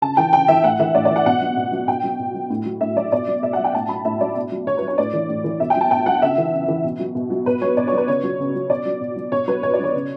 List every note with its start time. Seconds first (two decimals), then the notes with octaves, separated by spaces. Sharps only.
0.02 C#3 A5
0.17 E3 G5
0.33 C#3 G5
0.48 E3 E5
0.64 A2 F#5
0.80 E3 E5
0.95 A2 D5
1.05 D5
1.11 E3
1.16 F#5
1.26 B2 F#5
1.41 F#3
1.57 B2
1.72 F#3
1.88 B2 G5
2.04 F#3
2.20 B2
2.34 F#3
2.50 A2
2.66 F#3
2.81 A2 E5
2.96 F#3 D5
3.12 B2 D5
3.27 F#3
3.43 B2 E5
3.53 F#5
3.58 F#3
3.64 G5
3.74 A2 A5
3.89 F#3 B5
4.05 A2 E5
4.20 F#3 D5
4.36 B2
4.52 F#3
4.67 B2 C#5
4.77 B4
4.82 F#3
4.88 C#5
4.98 A2 D5
5.13 E3
5.29 A2
5.44 E3
5.60 B2 E5
5.70 G5
5.76 F#3 A5
5.91 B2 G5
6.06 F#3 F#5
6.22 C#3 E5
6.38 E3
6.53 C#3
6.68 E3
6.84 B2
6.99 F#3
7.15 B2
7.30 F#3
7.46 B2 B4
7.61 F#3 C#5
7.77 B2 D5
7.88 C#5
7.92 F#3
7.98 B4
8.08 C#3 C#5
8.23 F#3
8.39 C#3
8.54 F#3
8.70 B2 D5
8.85 F#3
9.01 B2
9.16 F#3
9.32 B2 C#5
9.48 F#3 B4
9.63 B2 C#5
9.73 D5
9.79 F#3 C#5
9.94 C#3